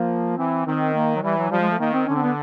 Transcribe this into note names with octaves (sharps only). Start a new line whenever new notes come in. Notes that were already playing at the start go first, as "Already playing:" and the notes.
Already playing: F3 A#3
E3 C4
D#3 C4
A#3
F#3
E3 G3
F#3
F3 G3
G#3
A3
D#3 A#3
C4
D3 C#4
C4
B3